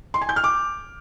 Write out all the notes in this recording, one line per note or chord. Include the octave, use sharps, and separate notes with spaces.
C6
G#5
G6
F6
D6